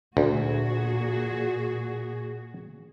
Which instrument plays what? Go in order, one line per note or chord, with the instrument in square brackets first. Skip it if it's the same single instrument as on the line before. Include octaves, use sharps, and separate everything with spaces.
[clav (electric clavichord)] D2 [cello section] A#2 F#4 G#4